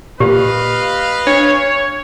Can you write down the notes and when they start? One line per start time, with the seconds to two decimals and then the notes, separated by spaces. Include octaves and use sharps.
0.20 A#2 G4 B4 D#5 F5
1.27 D4 C#5